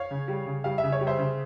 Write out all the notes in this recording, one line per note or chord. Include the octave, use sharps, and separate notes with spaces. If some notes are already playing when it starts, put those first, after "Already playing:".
Already playing: C#5 F5
C#3
G3
C#3
G3 F5
E5
C#3
C#5
G3
C5 E5
C#3